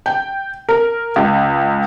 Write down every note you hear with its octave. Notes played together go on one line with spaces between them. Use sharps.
G5
A#4
C#2